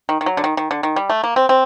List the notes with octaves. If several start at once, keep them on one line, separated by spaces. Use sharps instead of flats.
D#3
D#3
F#3
D3
D#3
D#3
D3
D#3
G3
A3
A#3
C4
C4